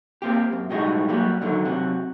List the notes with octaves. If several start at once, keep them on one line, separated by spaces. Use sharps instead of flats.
A#3 C4 G4
F#2
B1 A2 G3 G#3 D#4 F#4
F#3 G3 A#3 F#4
G#2 D3 D#3 F#3
C3 F#3 F#4